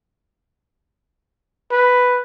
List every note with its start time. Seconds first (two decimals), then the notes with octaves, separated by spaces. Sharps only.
1.72 B4